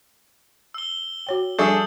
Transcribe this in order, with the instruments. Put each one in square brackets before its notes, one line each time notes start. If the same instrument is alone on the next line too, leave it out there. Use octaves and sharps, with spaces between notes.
[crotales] E6 G7
[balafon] F#4 C#5 G5
[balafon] F3 G3 C#6 [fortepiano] D4 G#4 A4 [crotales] D#6 G6